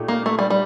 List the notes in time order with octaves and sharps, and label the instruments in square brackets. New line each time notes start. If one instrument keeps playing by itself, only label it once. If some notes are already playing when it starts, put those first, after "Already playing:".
Already playing: [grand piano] A#2 A3 D#4 G4
[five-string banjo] A#3
A3
G3
G3